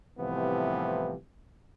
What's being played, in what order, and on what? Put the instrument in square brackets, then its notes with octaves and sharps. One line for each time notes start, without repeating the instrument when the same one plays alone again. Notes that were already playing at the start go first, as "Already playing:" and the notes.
[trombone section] C2 A2 C3 E3 F3 B3